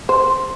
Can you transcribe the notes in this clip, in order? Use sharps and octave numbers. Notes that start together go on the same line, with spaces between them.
C5